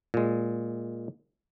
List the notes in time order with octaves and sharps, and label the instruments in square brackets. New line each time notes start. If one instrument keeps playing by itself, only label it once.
[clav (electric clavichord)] A#2 G#3